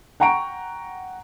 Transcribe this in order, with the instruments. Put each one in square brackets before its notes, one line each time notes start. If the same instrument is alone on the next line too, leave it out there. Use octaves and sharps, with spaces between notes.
[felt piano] F#5 G5 A#5 C#6 D7